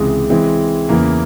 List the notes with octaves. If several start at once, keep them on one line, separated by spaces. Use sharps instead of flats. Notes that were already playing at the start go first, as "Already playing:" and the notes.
Already playing: C#2 C3 E3 G#3
E3 G#3 C4
E2 C#3 E3 A#3